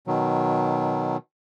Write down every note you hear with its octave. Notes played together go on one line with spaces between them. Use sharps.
B2 D#3 F#3